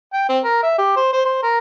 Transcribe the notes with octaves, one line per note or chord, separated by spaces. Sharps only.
G5
C4
A#4
E5
G4
C5
C5
C5
A#4